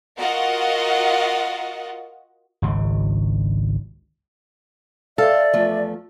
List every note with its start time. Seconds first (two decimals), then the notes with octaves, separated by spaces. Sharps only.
0.18 F4 F#4 A#4 D#5 F#5
2.62 G#1 C#2 C#3
5.18 A4 C5 D5 E5 F5
5.53 E2 F3 A3